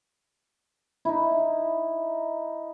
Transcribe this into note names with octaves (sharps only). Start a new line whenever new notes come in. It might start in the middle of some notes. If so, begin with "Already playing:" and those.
D#4 E4